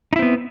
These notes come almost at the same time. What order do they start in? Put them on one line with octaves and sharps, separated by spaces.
D#4 E4 C4 B3